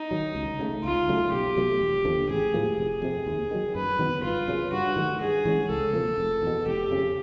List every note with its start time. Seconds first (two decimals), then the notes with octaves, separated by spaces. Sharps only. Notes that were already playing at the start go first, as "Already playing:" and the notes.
Already playing: D#4
0.11 D#3 F#3
0.35 C#2
0.59 C#3 F#3 A3
0.83 C#2 F4
1.08 C#3 F#3 A3
1.32 B1 G4
1.57 B2 F#3 A3
1.81 E1
2.05 D#2 D3 F3
2.29 A1 G#4
2.54 A2 F3 A#3
2.77 F1 G#4
3.02 F2 C3
3.26 D#2
3.51 D#3 F#3
3.75 F#2 B4
3.99 D#3 F#3 B3
4.23 G1 F4
4.48 F#2 C#3
4.72 G2 F#4
4.96 D#3 F#3 A3
5.21 G2 G#4
5.45 E3 G#3 C#4
5.70 C#2 A4
5.93 C3 F3 A#3
6.18 F1
6.42 E2 B2
6.67 F1 G4
6.91 F2 C#3